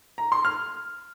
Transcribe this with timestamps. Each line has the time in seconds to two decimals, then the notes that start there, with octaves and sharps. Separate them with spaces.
0.18 A#5
0.32 C6
0.45 F6